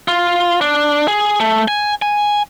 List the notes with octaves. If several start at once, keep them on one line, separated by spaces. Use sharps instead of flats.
F4
D4
G#4
A3
G#5
G#5